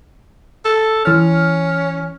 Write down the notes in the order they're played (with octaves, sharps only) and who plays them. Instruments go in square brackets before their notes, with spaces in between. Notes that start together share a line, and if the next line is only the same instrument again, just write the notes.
[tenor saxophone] A4
[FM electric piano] E3 F6 [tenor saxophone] C#4